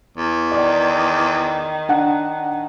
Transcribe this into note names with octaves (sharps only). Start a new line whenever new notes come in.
E2
D#3 D5
D4 F#5